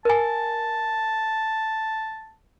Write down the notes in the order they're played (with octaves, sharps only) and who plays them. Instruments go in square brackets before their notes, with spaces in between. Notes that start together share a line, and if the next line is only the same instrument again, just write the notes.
[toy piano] A#4 G#5 [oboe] A5